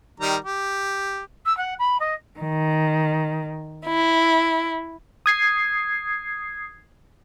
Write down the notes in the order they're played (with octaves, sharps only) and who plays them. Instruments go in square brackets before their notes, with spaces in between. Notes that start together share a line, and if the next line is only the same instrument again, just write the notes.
[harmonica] D#3 G3 A#5
G4
[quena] E6
F#5
B5
D#5
[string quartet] D#3
E4
[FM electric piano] D#6 G#6 C7